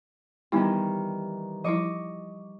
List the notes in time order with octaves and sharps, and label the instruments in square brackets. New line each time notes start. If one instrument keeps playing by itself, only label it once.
[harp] D#3 E3 G3 [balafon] B3 D#4 E4
[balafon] F3 G3 E4 [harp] D#5 C#6 D6